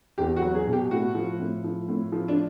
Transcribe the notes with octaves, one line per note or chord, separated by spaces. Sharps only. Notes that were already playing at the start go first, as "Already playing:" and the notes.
E2 G4
F#4
F#3
G#4
B2
G4
A2 F#4
F3
A2
F3
A2
F3
D4